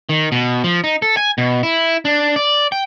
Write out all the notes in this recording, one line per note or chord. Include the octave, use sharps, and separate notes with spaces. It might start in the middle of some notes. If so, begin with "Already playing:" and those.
D#3
B2
F3
D#4
A4
G#5
B2
E4
D4
D5
G5